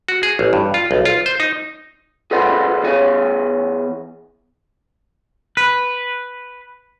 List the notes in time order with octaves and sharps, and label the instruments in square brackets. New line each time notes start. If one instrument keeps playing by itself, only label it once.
[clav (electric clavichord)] F#4
G#4
A1
G2
F4
B1
F4
C5
D#4
[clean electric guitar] G#4 A4 B4 C5 D5 F#5
E2 G#4 C#5
B4